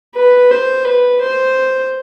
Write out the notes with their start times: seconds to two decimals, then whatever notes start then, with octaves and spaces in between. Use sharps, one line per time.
0.15 B4
0.51 C5
0.85 B4
1.21 C5